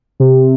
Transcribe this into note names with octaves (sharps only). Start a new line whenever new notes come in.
C3